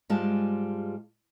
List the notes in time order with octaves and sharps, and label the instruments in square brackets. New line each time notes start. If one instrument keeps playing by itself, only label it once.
[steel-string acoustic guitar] G#2 G3 G#3 F4 F5 A5